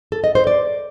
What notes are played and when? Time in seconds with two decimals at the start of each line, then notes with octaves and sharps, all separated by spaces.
0.12 A4
0.24 D#5
0.35 C5
0.47 D5